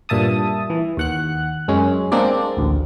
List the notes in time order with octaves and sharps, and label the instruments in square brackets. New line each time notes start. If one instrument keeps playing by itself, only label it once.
[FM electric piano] G2 A#2 E5 A5 D#6
E3
D#2 F#5 F#6
F#2 G#3 C#4
G#3 A#3 C4 D4 D5
A1 D2